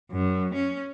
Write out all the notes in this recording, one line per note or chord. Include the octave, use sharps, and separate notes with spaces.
F#2
C#4